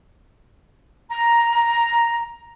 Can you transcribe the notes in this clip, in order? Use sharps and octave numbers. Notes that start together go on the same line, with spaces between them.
A#5